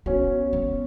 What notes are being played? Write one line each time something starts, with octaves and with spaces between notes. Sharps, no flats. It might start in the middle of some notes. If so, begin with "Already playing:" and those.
B3 C#4 F#4
B3